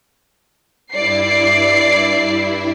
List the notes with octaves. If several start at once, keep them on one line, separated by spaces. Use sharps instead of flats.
G2 E4 D5 C7